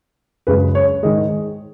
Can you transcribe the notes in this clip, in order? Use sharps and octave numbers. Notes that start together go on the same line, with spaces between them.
F#2 C#3 G#3 B4
C#5
G#2 D#3 G#3 D#5